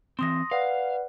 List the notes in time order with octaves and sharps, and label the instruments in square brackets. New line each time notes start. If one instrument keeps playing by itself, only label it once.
[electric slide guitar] E3 C4 [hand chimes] C6 D#6 A#6
[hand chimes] B4 D5 F#5 [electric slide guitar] F5